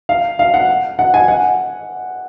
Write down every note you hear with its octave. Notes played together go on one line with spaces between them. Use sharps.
F5
F5
F#5
F#5
G#5
F#5